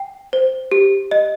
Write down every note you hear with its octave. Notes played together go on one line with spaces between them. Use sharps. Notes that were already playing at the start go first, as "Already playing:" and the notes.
Already playing: G5
C5
G4
D#5